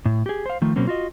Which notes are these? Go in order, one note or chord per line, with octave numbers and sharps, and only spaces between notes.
A2
G4 G#4
C5 F5
D#3 F3 A3
B2 F#3 A#3 C4 C#4
F4 F#4 D#5